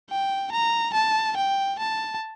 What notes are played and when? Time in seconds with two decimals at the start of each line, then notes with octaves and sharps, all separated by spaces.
0.10 G5
0.52 A#5
0.94 A5
1.37 G5
1.79 A5